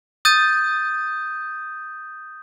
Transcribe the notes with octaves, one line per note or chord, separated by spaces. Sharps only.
D#6 G6 A6 D#7